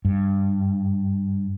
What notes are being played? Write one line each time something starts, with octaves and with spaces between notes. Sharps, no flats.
G2